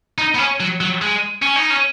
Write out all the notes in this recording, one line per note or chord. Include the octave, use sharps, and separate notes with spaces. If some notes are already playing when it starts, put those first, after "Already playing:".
D#4
B3
C#4
F#3
F#3
G#3
C#4
D#4
C#4